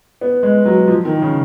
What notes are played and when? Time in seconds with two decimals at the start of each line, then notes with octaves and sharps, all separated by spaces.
0.21 B3
0.43 G#3
0.66 F#3
0.88 F3
1.05 D#3
1.22 C#3